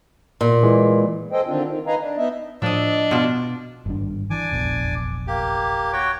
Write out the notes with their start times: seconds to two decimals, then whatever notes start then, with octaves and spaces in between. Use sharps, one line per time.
0.41 A#2
0.63 E3 G#3
1.32 G#4 A4 C5 D#5 G5
1.47 D3 D#3 C4 D4 F4
1.66 D#3
1.87 B4 D#5 F5 G#5 A#5
2.00 D4
2.18 B3 D#4 D#5 E5
2.62 A2 F3 D4 D#5 E6
3.11 B2 F4
3.86 G#1 G2 D4
4.30 E3 D4 G#5 D6
4.51 F1 A#1 E2
5.28 A#3 G4
5.93 F#4 C#5 G5